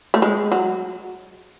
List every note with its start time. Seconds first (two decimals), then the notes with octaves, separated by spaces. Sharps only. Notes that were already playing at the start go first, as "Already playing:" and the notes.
0.14 A3
0.22 G#3
0.52 F#3